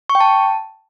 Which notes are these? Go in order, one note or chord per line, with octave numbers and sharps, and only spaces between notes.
C#6
G5
A5